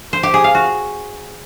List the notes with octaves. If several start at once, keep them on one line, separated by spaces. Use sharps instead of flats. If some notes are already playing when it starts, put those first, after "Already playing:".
C5
G4
G#4
F5
F#4